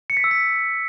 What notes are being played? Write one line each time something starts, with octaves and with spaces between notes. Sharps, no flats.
C#7
B6
E6
B6